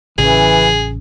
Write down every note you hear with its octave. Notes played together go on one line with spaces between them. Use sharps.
A1 C#3 E3 G#4